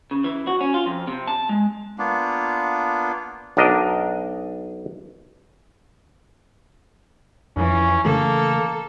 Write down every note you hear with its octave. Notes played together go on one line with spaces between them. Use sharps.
C#3
E3
F#4
C#4
F4
F2
C3
A5
G#3
A#3 B3 D4 F4
B1 D4 A#4 D#5
F2 E3 C#4
C#3 E3 A3 A#3 A4